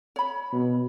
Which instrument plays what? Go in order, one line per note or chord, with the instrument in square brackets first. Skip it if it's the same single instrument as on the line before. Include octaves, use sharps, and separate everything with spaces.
[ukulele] C#5 B5
[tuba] B2